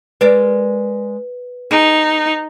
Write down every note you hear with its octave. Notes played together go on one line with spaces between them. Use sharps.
G#3 A#4 B4 D5
D#4 G#4